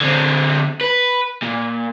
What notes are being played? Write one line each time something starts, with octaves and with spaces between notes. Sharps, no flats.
D3 C4
B4
A#2